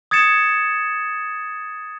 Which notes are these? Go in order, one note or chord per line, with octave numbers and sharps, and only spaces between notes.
D#6 G#6 A6 C#7 E7